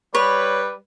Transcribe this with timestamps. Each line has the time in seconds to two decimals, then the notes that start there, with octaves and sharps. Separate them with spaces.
0.15 G3 B4 C#5 B5